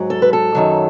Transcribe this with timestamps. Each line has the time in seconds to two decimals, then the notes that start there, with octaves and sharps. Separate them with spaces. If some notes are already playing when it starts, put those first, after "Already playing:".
Already playing: G#2 F#3
0.10 A4
0.22 B4
0.33 A4
0.55 F#2 D#3 F#3